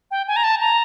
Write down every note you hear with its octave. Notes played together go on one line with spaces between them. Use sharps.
G5
G#5
A#5
A5
A#5